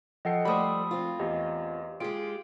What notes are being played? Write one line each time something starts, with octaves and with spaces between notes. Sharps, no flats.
F3 A4 D#5 F#5 G5 C7
G3 A3 C5 B5 D#6
C4 F4
E2 G4 D#5
G#3 F4 G4 G#4 D7